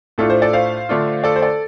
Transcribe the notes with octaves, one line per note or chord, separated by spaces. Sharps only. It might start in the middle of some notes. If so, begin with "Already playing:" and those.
A2 A3 D4 F4 A4
C5
A4 D5
C5 F5
D3 A3 D4 F4
A4 D5
C5
A4 D5